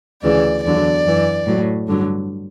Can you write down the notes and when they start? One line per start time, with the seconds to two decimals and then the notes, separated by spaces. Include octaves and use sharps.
0.22 D2 C#3 E3 D5
0.64 E2 D3 F#3 D5
1.05 F#2 E3
1.46 A2 F#3
1.87 G2 D3 F#3